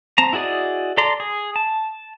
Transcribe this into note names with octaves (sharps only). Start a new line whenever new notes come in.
C4 A5 A#5
E4 F#4 G#4 D5 D#5
A4 D5 A#5 C6
G#4
A5